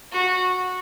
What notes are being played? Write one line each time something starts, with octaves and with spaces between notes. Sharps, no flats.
F#4